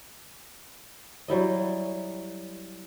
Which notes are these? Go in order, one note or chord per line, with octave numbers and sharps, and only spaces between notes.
F#3 G3 E4 D#5